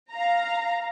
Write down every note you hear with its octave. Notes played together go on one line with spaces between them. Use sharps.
F5 A#5